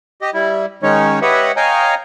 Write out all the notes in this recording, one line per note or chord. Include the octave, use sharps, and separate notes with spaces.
G4 D#5
G3 E4
D#3 G#3 C#4 D#4 C#5
G4 B4 C#5 D#5 E5 F#5
C#5 D#5 F5 G5 G#5 A#5